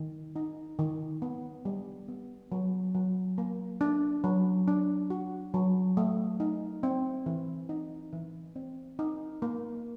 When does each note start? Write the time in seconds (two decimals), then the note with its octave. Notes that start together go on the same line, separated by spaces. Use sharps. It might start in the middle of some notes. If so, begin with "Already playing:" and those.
Already playing: D#3
0.36 D#4
0.79 D#3
1.22 B3
1.65 G3
2.09 B3
2.52 F#3
2.95 F#3
3.38 A#3
3.81 D4
4.24 F#3
4.68 D4
5.10 F#4
5.54 F#3
5.97 A3
6.40 D#4
6.83 C4
7.26 E3
7.69 D#4
8.13 E3
8.56 C4
8.99 D#4
9.42 A#3